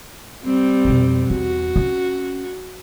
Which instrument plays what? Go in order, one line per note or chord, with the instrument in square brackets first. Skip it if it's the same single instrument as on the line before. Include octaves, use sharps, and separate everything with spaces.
[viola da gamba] G3 C4
[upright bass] F2 B2
[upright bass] E2 [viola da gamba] F#4
[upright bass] C#4